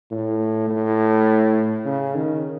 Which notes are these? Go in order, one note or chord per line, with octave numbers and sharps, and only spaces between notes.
A2
A2
C#3
D#3